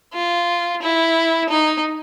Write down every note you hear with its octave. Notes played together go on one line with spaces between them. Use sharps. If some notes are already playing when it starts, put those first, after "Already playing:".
F4
E4
D#4